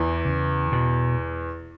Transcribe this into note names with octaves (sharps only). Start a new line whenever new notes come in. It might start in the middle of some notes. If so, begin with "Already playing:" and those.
Already playing: E2 E3
C#3
B2